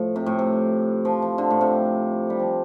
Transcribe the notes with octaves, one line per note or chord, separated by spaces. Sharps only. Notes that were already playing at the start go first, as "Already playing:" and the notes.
Already playing: A2 F3
C3
A2
C3
F3
F3
D3
A2
C3
G3
F3